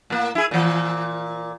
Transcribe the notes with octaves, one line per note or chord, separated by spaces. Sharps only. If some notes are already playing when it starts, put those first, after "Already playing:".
A2 A#3
E4 G#4
A#2 E3